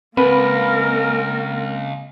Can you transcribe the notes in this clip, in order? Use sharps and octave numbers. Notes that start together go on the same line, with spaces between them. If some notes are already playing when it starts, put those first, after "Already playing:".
C#2 A#3 C4 A#4 B4